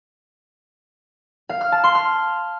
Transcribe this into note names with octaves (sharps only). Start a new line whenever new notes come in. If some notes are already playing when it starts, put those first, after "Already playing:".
F5
F6
A5
C6
F6